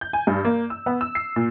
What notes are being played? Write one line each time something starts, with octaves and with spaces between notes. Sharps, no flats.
G6
G#5
G2
A#3
E6
B3
E6
C7
A#2